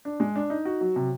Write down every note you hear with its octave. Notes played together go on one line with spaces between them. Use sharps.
D4
G#3
D4
D#4
F#4
F#3
C3